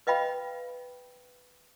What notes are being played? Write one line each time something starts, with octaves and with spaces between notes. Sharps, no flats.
B4 D#5 F5 G5 B5